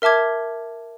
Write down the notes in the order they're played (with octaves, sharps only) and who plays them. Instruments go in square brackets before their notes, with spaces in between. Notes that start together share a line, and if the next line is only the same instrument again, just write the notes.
[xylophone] A#4 E5 A5 D6 G#6